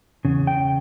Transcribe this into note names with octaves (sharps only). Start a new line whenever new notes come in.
E2 C#3
G5